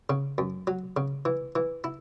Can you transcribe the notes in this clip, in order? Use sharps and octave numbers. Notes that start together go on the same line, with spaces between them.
C#3
F#2
F#3
C#3
E3
E3
E4